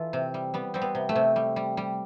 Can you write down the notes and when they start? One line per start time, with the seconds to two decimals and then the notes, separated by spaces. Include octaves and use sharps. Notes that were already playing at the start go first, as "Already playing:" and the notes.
Already playing: E3 F4 A4
0.13 C3
0.34 G3
0.54 G3 B3
0.74 G3 C4
0.81 B3
0.95 C3
1.09 A3
1.15 C3
1.36 G3
1.56 G3
1.77 G3